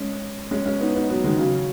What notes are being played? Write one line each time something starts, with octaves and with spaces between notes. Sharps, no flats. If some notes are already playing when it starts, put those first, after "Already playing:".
Already playing: G#3 C#4
G#3 C#4
G#3 C#4
B3 D#4
B3 D#4
F#3 B3
D#3 G#3
C#3 F#3